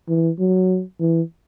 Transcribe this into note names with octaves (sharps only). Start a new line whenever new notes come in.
E3
F#3
E3